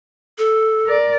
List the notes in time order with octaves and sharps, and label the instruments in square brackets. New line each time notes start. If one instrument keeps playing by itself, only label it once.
[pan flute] A4
[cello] A#4 D5